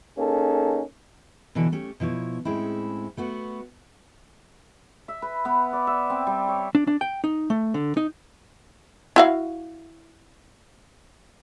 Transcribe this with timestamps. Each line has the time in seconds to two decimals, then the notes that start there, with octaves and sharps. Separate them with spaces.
0.18 A#3 C#4 D#4 G#4 A4
1.55 B2 D3 E3 D4 A4
1.72 A3 C#4 G4
2.00 B2 F3 E4 C#5
2.45 A2 G#3 C4 C#4 E4
3.17 A3 B3 F#4
5.08 E5
5.22 B4
5.45 B3
5.73 D5
5.87 E5
6.10 C4
6.27 G3
6.48 C#5
6.75 D4
6.87 D4
7.01 G5
7.24 D#4
7.50 A3
7.74 D3
7.97 D#4
9.16 E4 F#4 F5